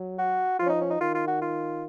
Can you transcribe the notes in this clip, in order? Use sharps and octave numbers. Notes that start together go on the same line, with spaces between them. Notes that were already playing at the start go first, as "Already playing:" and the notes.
Already playing: F#3
F#4
F3 F4
C#4
D#4
C#4
D#4
D#3 F4
F4
F#4
F4